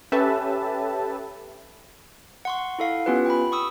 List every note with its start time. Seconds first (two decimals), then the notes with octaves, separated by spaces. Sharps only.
0.12 C#4 G4 A4 B4 E5 A5
2.45 F#5 C6 C#6
2.79 E4 A4 F5 F#5
3.06 B3 C#4 F4 G4 B4
3.26 G5 B5
3.52 C#6 D#6 E6